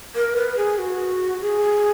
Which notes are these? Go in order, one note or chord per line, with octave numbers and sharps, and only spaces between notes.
A#4
B4
G#4
F#4
G#4